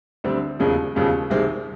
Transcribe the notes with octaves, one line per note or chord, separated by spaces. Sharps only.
D2 D3 G3 C4
E1 D#2 C#3 F3 G#3
E1 D#2 C#3 F3 G#3
C2 C3 D#3 G#3 C4